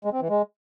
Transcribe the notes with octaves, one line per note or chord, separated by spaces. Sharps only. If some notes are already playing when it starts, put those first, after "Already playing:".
G#3
C4
E3
G#3